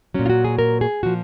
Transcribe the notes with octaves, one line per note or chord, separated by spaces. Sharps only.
A#2 F#3 C#4
F4
F#4
G#4
A#4
G#4
A#2 F3 F#4